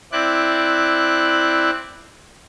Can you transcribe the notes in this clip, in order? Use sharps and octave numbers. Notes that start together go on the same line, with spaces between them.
C4 E4 D5 F#6